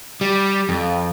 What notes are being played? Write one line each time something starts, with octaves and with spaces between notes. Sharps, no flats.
G3
F2